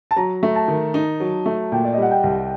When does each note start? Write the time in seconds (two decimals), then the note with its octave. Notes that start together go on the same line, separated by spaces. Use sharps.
0.11 A5
0.16 F#3 A#5
0.43 A3
0.56 A5
0.68 D#3
0.94 D#4
1.20 F#3
1.46 A3
1.72 A#2 G5
1.85 D5
1.94 D#5
1.98 G3 F#5
2.11 G5
2.23 C2